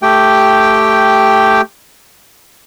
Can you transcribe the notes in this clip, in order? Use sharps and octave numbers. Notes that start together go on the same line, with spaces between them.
A3 G4 G5